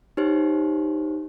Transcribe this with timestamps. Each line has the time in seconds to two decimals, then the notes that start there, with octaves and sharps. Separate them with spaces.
0.17 D#4 G4 C5 C#5